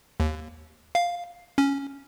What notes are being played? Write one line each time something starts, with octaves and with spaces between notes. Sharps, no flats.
D#2
F5
C#4